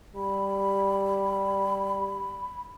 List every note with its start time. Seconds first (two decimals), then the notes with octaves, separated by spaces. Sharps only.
0.16 G3 B5